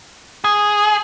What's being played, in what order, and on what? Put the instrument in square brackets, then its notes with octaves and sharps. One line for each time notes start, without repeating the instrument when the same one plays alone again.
[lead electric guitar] G#4